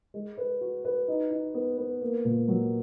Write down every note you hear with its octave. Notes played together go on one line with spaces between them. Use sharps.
G#3
B4
F#4
B4
D#4
D#4
B3
B3
A#3
A#2
F#3